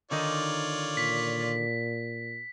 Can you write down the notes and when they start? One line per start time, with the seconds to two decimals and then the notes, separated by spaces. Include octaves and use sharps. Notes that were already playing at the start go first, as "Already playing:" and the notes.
0.11 D3 D#3 D#4 F4 C#5 D5
0.97 A#2 B6